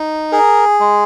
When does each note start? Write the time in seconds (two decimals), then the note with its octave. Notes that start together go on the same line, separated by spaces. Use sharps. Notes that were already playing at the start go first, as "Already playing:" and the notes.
Already playing: D#4
0.32 G#4 A#4
0.80 G#3